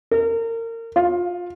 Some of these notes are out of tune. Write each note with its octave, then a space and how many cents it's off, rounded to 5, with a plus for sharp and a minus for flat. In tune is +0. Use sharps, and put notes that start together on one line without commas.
A#4 -30
F4 +20